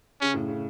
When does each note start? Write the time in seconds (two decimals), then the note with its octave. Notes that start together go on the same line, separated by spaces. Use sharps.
0.21 C#3 C#4
0.34 A2
0.48 C#3